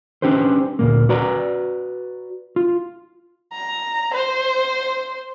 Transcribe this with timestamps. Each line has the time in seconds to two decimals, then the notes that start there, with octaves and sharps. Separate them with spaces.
0.22 C#4 D4 G4 B4 C5
0.79 D2 A#2 A#3
1.09 F#4 B4 D5 A#5
2.56 F4
3.53 A#5
4.15 C5